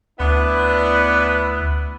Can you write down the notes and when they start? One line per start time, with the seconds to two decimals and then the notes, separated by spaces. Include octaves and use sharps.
0.20 D2 B3 D4 E4